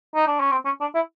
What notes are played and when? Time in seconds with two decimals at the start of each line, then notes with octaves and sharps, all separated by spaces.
0.15 D#4
0.27 D4
0.40 C#4
0.51 C4
0.65 C#4
0.81 D4
0.95 E4